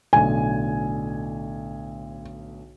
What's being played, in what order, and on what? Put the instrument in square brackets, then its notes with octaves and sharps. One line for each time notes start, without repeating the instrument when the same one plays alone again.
[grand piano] B1 A2 D3 [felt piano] G#5